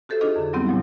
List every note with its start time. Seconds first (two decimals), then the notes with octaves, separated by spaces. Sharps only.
0.09 F#4 G4 A4 C5 E5
0.21 D4 D#4 F4 G#4 A4 D#5
0.36 F2 D3
0.53 F#3 G3 B3 C4 E4 G4
0.67 A#2 C#3 F3 F#3 G#3 A3